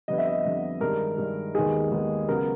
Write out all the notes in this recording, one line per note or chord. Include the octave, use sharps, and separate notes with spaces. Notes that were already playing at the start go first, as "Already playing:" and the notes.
F2 D3 G3 B3 D#5
E5
D#5
F2 D3 G3 B3
G2 D#3 G#3 A#4
G2 D#3 G#3
D#2 D#3 G#3 B3 D#4 G#4
D#2 D#3 G#3 B3 D#4
C#3 F#3 B3 A#4